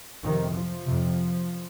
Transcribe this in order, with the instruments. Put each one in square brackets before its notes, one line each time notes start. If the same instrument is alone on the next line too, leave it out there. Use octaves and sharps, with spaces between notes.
[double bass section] F2 C3 D#3
F3
F2 C3